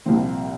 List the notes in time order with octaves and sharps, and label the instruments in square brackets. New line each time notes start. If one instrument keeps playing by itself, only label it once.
[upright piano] C2 A#2 F3 C4